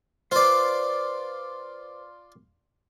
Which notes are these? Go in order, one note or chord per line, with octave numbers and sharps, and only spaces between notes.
F4 B4 C5 D5